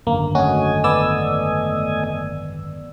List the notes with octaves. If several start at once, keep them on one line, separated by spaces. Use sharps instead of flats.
G#1 F#2 D3 A#3
A3 C#4 F#4 D#5 G#5
B3 D5 E6